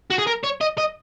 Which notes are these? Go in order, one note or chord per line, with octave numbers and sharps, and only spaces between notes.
F#4
G#4
A#4
C#5
D#5
D#5